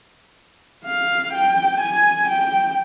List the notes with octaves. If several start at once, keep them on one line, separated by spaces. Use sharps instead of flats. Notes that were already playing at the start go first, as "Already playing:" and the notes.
F5
G5
G#5
G5